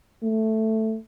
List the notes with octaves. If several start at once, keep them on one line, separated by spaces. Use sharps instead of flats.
A3